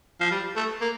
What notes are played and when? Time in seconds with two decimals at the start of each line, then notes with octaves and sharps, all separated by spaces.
0.21 F3
0.31 G3
0.56 A3
0.81 A#3